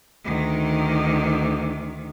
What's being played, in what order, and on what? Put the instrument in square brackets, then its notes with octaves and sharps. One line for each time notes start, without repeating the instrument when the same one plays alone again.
[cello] D2 D#3